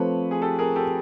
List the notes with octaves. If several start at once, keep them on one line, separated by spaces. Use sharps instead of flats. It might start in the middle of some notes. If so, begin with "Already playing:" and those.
Already playing: F3 A3 C4 B4 C#5
G#4
G4 A4
G#4 A#4
G4 A4